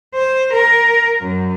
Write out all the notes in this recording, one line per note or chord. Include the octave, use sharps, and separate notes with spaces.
C5
A#4
F#2